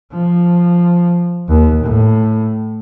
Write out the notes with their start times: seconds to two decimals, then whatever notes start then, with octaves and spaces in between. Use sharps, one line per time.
0.12 F3
1.48 D#2
1.83 A2